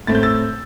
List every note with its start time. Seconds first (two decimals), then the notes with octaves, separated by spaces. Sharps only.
0.07 A2 A3 C4 A6
0.15 G6
0.23 E6 A6